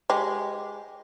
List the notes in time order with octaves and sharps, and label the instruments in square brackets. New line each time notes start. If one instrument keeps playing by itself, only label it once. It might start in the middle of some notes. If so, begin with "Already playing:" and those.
[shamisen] G#3 G4